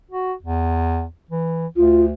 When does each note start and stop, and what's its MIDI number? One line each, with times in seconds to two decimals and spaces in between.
0.11 0.33 66
0.43 1.06 40
1.31 1.67 52
1.76 2.13 38
1.76 2.04 65